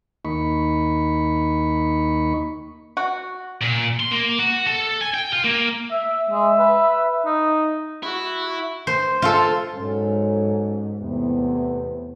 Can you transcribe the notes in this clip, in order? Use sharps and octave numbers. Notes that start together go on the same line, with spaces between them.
D#2 A#3 D#4 B5 C#6
F#4
A#2
C6
A#3
F#4
A4
G#5
G5
F4
A#3
E5
G#3 E5
B4
D#4
E4 F#4
C5
F4 A4
G#2 F#3 C#4 A4
E2 A2 C3 B3